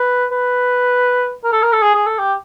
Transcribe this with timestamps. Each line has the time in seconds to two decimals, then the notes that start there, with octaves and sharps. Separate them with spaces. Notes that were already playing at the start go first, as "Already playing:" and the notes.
Already playing: B4
0.31 B4
1.44 A#4
1.53 A4
1.63 A#4
1.72 A4
1.82 G#4
1.95 G#4
2.07 A4
2.19 G4